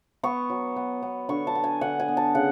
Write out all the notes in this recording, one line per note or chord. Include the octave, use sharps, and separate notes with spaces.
B3 C#6
F#3
B3
B3
D3 C#6
A5
B3
G#5
D3 F#5
G#5
B3
A5
C#3 F#5